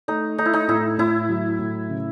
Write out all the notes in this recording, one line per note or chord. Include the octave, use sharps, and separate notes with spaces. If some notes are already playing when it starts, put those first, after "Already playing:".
A3 D#4
A3 D#4
E4
D#4
A2 E4
A2 E4
F#3
A2
C#3